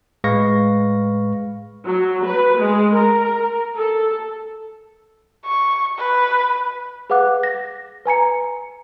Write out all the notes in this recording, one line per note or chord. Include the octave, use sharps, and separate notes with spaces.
A2 G#3 B4 F5 C#6 A#6
F#3
B4
G#3
A#4
A4
C#6
B4
G#4 B4 F5 F#5 D6 F#6
A#6
B4 G#5 A#5 C#7